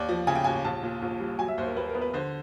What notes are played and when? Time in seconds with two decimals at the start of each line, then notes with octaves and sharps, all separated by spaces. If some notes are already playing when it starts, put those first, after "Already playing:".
Already playing: D#2 D5
0.08 F3
0.27 C#3 G#5
0.35 G5
0.44 D#2 G#5
0.64 A#1 A5
0.83 A#2
1.02 A#1
1.20 G3
1.39 F#3 G#5
1.48 E5
1.58 D#2 C5
1.67 A#4
1.76 D#2 B4
1.89 A#4
1.95 B3
2.01 B4
2.13 D3 C5